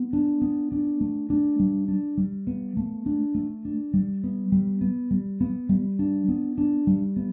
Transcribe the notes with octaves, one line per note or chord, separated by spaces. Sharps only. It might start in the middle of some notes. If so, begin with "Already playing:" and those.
Already playing: B3
D4
B3
D4
A3
D4
G3
D4
G3
B3
A3
D4
A3
D4
G3
B3
G3
B3
G3
B3
G3
D4
B3
D4
G3
B3